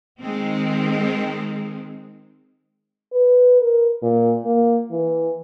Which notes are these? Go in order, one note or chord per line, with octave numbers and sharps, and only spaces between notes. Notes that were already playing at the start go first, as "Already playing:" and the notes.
D#3 G#3 C4
B4
A#4
A#2
A#3
E3